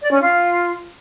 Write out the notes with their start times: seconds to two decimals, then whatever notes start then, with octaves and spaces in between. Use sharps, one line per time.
0.02 D5
0.12 C#4
0.21 F4